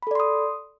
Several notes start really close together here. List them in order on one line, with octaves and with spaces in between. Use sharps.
B5 A4 D5 C6 D#6